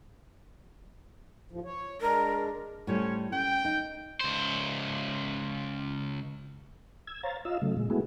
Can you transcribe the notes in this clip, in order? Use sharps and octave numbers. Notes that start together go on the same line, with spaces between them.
D#2 A2 F3
C#5
G#3 D4 A#4
A2 G3 C#4 C5 C#5
C#4 G5
D#4
C#2 C5
E6 G#6
C5 C#5 F5 A#5 A6
F4 D#5 F5 E6
C#3 F#3 A3
A#2 G#3
G#3 A3 B3 E4 F#4 G#4